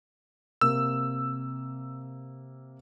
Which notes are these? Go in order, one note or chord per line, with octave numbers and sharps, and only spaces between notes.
C3 A#3 E6